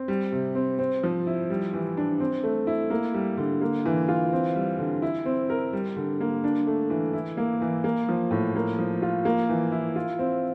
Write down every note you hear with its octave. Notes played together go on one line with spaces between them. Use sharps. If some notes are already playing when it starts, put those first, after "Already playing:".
Already playing: C4
G3
C3
C4
C4
F3
E4
G3
E3
D4
C4
A3
E4
A#3
G3
D3
A#3
E3
F4
C4
G3
D3
E4
C4
A#4
G3
D3
A#3
D4
A3
E3
E4
A#3
E3
A#3
F3
A2
A#3
F3
F4
A#3
E3
E4
F4
C4